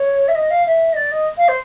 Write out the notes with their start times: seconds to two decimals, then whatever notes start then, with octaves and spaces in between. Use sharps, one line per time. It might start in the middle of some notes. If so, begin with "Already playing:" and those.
Already playing: C#5
0.28 E5
0.35 D#5
0.51 F5
0.66 E5
0.93 D#5
0.96 D5
1.12 D#5
1.37 F5
1.48 C5